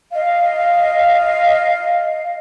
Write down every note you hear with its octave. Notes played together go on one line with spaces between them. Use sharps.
D#5 F5